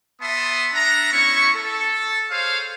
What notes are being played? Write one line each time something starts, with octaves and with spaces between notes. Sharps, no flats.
B3 E5 A5 B5 C6 D#6
D4 E5 F#5 A5 A#5
B3 C#4 E4 C#6
A4
G#4 C5 C#5 F5